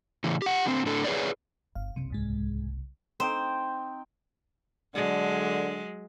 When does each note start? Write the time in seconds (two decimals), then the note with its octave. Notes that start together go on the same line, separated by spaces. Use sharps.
0.24 A2 C#3 E3
0.42 G4 F#5
0.65 D3 C4
0.86 A2 D4 A4
1.04 G#4 B4 C#5 D5
1.75 G1 F5
1.96 F#1 C2 C3
2.10 D2 G#2 G#3
3.20 C4 D#4 C5 G5
4.95 D3 F#3 G#3